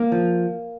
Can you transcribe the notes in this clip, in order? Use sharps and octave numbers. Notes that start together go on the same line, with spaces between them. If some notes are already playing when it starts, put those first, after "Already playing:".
Already playing: A#3
F3